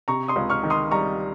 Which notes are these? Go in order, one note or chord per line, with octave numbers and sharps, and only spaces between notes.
C3 A#5 C#6
C6 D#6
C#2
C#6 F6
D#3
C6 D#6
G3 A#5 C#6